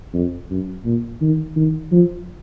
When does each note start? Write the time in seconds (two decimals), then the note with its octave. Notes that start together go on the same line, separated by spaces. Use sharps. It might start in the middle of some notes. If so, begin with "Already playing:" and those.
0.14 F2
0.50 F#2
0.85 A#2
1.21 D#3
1.56 D#3
1.92 F3